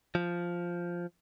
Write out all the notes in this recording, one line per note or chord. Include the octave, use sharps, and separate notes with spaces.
F3